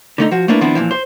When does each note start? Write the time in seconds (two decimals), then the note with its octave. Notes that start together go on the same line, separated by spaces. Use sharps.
0.18 D3 A3 D#4
0.31 F3 F#4
0.48 A3 A#3 D4 E4 B4
0.61 D#3 F3 B3 C4 D4 E4
0.75 A#2 C#3 E3 F3
0.91 C5